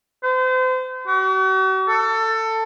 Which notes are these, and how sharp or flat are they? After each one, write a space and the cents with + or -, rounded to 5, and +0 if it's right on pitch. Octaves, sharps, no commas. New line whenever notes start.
C5 -35
F#4 +45
A4 +20